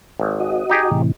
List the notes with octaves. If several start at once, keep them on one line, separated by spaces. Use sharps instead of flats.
G#1
F#4 D#5
D#4 G4 G#4
A2 C3 E3